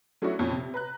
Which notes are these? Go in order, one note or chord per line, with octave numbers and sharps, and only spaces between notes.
F#3 A3 C#4 D4 E4 F#4
F2 A#2 C#4 F4
C3
B4 A#5 F#6